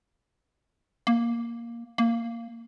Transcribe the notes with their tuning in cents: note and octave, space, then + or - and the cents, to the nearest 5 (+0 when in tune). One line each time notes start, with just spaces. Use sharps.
A#3 +5
A#3 -10